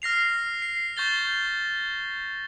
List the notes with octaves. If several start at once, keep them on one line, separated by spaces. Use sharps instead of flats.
F6 A#6 C7 F7
C7
C#6 G6 A6 G7